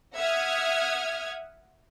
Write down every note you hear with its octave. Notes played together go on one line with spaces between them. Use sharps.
E5 F#5 D#6 F6 G#6